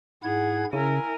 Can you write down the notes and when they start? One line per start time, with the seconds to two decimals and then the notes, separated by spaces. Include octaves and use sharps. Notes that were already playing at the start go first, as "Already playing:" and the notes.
0.23 G#2 E4 G#4 F#5 G#6
0.73 C#3 E4 A#4 G#5